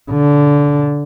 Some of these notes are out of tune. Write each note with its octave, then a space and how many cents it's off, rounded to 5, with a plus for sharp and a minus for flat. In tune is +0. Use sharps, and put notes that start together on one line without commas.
D3 -20